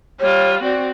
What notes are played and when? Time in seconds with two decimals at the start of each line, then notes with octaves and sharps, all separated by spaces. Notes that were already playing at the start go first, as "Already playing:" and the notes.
0.20 G3 F4 C#5
0.63 C4 F#4 D5